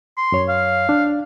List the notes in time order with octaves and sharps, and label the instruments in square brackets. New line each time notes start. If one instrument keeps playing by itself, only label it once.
[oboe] C6
[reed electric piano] F#2 C#5
[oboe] F5
[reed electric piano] D4